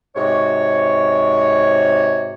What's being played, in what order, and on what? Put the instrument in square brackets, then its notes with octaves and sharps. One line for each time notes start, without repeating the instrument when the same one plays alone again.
[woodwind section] G#2 C3 F#4 C#5